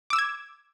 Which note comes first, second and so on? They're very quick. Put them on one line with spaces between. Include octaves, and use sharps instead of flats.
D6 E6 E7 G#6